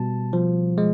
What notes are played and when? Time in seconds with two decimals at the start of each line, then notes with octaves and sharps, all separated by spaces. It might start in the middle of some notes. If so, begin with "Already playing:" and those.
Already playing: B2 G3 A5
0.33 F3
0.78 G#3